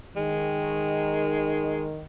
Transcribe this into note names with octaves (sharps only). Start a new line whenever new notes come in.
D#3 G#3